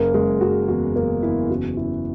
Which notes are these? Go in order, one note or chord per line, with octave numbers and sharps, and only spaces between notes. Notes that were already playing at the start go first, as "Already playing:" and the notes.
Already playing: F#1 A#3 A#4
F#1 G#3 G#4
F#1 F#4
E2 F#4
F#1 A#3 A#4
E2 E4
C#3 F#4
C#3 E4